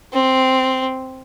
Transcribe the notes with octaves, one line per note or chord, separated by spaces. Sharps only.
C4